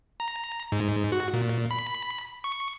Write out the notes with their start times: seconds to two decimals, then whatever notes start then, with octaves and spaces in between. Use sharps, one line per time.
0.20 A#5
0.72 G#2
1.12 F#4
1.33 A#2
1.71 B5
2.44 C#6